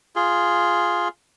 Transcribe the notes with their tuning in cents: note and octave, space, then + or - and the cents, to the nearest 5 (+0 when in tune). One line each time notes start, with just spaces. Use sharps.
F4 +0 G#4 +0